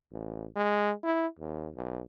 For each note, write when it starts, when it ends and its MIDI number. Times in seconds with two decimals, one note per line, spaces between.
0.12 0.45 33
0.56 0.92 56
1.04 1.27 64
1.39 1.68 39
1.75 2.01 35